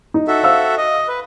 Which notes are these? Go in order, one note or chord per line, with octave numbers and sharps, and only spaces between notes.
D#4
F#4 A4 E5
C5 F5 E6
D#5
B4